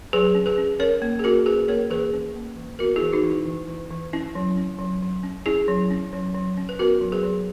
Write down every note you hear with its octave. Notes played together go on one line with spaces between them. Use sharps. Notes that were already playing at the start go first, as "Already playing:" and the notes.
F#3 G#4 B4
C#4
G#4 B4
C#4
C#4 A#4 C#5
A#3
G#4
C#4 F#4 A#4
C#4 G#4 B4
A#3 A#4 C#5
E3 G#4 B4
C#4
A#3
E3
B3 F#4 A#4
E4 G#4
E3
D#4 F#4
E3
E4
E3
E3
E3
C#4 E4
F#3
C#4
F#3
F#3
C#4
C#4 E4 G#4
F#3
C#4
F#3
F#3
C#4
B4
B3 F#4 A#4
F#3
G#4 B4
F#3